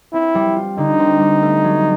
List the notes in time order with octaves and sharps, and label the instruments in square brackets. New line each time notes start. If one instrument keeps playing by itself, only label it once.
[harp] C4 [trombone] E4
[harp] G3
F4
[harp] D3 [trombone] D#4
[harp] C4
G3
A3
F#3